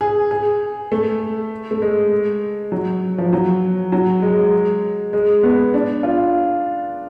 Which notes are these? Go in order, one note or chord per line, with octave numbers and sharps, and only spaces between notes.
G#4
G#4
A3
A3
G#3
F#3
F3
F#3
F#3
G#3
G#3
B3
D4
F4